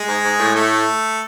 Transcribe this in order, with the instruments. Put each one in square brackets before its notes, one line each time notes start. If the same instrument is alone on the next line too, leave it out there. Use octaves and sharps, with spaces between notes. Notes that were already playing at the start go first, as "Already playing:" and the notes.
Already playing: [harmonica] G#3 G#4
[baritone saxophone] G#2
G#2
A2
[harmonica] A3 A4